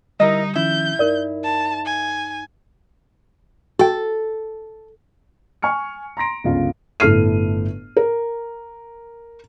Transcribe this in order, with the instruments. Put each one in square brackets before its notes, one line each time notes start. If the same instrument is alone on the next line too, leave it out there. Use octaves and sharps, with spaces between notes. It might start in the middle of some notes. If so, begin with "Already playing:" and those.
[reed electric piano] D3 G3 [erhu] D#4 [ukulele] E4 A#4 D#5
[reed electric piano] D#3 F3 C#4 [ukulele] E4 [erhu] G6
[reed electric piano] G2 D#4 [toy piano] A#4 D5
[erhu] A5
G#5
[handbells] F#4 G5 [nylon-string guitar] A4
[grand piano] G#5 C#6 F6 C#7
A#5 C6 A#6 D7
G1 C#2 F4 F5
[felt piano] G1 A2 A4 F6 C7 D#7
A#4